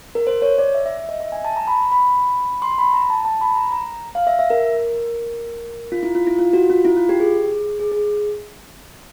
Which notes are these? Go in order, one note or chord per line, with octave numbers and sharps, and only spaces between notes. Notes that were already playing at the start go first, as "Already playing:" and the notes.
A#4
C5
C#5
D5
E5
E5
E5
D#5
E5
G#5
A5
A#5
B5
B5
C6
B5
A#5
A5
A5
B5
A#5
A#5
F5
E5
E5
A#4
F4
E4
F4
E4
F4
F#4
F4
E4
F4
G4
G#4
G#4
G#4